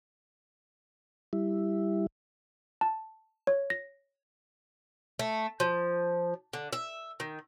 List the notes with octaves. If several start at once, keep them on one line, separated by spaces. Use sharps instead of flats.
G3 E4
A5
C#5
A#6
A3
F3
D3
E5
D#3